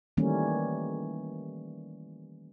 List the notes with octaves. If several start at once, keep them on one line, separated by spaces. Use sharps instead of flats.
D#3 E3 G3 A3 A#3 C#4